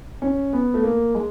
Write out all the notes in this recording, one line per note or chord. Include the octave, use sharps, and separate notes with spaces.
C#4
B3
A3
A#3
G#3